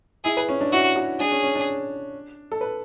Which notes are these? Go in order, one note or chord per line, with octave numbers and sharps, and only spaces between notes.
E4 G#4
B4
C#4
D4
E4 F#4
F#4
D4 G#4
C#4
C#4
D4
A4
B4